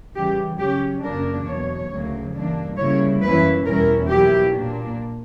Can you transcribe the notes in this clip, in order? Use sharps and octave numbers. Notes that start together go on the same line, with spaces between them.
C#3 E3 G3 G4
C#3 F#3 C#4 G4
F#2 C#3 F#3 A#3 D4 A#4
E2 B2 F#3 C#5
D2 C#3 F#3 A#3
G2 E3 A#3 D4
C#3 G3 A#3 E4 C#5
F#2 E3 A#3 C#4 E4 B4
E2 B2 G3 C#4 E4 A#4
B2 F#3 A#3 E4 G4
A#2 A#3 D4